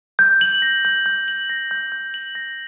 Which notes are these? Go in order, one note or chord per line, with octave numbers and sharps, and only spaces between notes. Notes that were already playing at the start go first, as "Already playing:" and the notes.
G6
F#7
A#6
G6
G6
F#7
A#6
G6
G6
F#7
A#6